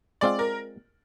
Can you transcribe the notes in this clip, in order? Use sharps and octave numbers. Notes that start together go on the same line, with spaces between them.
G#3 C4 F4 D5
A#4